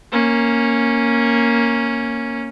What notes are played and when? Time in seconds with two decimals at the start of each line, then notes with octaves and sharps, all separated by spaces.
0.12 A#3 C#4